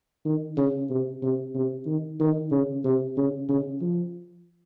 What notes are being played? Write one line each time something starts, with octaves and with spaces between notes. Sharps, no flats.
D#3
C#3
C3
C3
C3
D#3
D#3
C#3
C3
C#3
C#3
F3